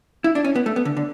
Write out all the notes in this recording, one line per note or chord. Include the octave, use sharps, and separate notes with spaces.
E4
D4
C#4
B3
A3
B3
D3
D3